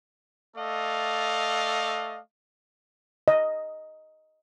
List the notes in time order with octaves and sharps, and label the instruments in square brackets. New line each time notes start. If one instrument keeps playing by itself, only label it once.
[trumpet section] A3 A4 D5 D#5 F5
[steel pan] D#5